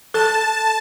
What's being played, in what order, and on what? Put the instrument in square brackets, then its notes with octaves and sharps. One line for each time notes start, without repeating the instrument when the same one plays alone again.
[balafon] A4 [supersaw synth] A5